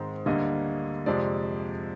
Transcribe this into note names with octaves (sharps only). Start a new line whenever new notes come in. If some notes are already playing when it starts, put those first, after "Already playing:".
Already playing: G#2 D#3 G#3 C4
D2 D3 G3 A#3 D#5
F2 C3 F3 G#3 D5